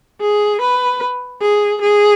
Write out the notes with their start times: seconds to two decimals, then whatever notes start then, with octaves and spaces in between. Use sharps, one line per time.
0.21 G#4
0.61 B4
1.41 G#4
1.82 G#4